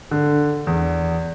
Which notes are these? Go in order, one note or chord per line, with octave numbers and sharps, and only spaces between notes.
D3
E2